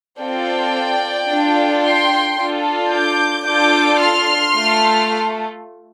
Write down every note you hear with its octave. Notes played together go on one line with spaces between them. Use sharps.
C4 F4 A4 D5 G5
D4 F4 A4
G5 C6
D4 F4 A4
D6 G6
D4 F4 A4 D6 G6
C6 F6
A3 F4 A4